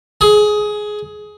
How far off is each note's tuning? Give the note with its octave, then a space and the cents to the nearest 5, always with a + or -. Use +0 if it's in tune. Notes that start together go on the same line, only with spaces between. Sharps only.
G#4 +15